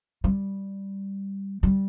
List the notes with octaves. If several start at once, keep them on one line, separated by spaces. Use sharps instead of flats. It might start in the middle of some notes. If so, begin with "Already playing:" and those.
G3
G3